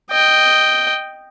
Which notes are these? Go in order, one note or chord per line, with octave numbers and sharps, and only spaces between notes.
D#5 G5